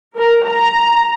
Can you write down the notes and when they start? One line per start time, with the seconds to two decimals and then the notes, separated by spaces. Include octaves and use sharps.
0.17 A#4
0.48 A#5